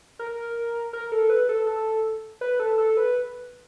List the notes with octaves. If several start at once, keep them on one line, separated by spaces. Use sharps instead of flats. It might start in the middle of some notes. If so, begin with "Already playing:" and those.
A#4
A#4
A4
B4
A4
A4
B4
A4
A4
B4